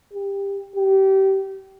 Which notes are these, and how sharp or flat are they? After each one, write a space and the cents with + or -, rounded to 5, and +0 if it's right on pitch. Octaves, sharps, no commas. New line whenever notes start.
G4 +20
G4 -25